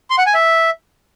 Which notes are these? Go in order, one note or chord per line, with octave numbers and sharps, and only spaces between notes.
C6
F#5
G#5
E5